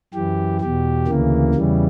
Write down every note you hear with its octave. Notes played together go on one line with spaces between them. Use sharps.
F#2 E3 G4
E2 B2 G4
D2 C#3 E3 A#3
E2 C#3 E3 G3